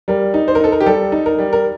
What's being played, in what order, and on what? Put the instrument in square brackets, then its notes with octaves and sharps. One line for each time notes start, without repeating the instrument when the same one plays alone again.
[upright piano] G3 A#4
D#4
C5
A#4
D#4 A4
A#4
G4
G3 A4
D#4
A#4
G3
A#4